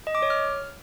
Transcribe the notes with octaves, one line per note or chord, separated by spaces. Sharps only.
D#5
D6
C#5
F6